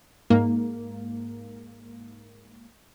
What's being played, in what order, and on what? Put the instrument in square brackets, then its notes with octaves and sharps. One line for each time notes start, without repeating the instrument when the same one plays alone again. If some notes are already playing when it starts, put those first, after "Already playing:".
[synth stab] G#2 A#3